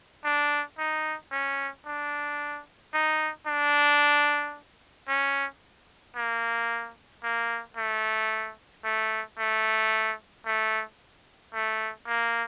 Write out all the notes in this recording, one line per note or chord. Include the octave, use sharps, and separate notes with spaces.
D4
D#4
C#4
D4
D#4
D4
C#4
A#3
A#3
A3
A3
A3
A3
A3
A#3